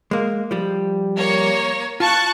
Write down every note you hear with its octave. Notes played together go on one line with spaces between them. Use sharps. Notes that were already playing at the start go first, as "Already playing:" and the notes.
G#3 A#3
F3 G3
A#3 C#5
F4 A5 C#6 F#6